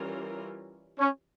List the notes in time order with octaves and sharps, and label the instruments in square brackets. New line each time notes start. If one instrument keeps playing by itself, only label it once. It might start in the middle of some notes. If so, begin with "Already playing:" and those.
Already playing: [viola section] E3 G3 C#4 F4 A#4
[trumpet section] C#4